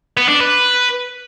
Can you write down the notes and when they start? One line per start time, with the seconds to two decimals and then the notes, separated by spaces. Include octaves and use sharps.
0.17 B3
0.29 D4
0.40 B4